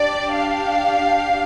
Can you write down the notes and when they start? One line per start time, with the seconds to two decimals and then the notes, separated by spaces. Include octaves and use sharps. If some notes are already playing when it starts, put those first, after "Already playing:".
Already playing: D4 G4 D5
0.33 F5